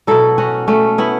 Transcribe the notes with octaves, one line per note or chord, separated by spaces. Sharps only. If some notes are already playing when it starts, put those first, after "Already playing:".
B2 F#3 E4 A4
C#4 F#4
A3 C#4
B3 E4